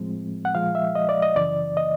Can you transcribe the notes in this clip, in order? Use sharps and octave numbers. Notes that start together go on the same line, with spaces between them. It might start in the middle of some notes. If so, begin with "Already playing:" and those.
Already playing: A2 F3 G#3 C4
F#5
A#2 F3 G#3 F5
E5
D#5
D5
D#5
F#2 C#3 E3 D5
D#5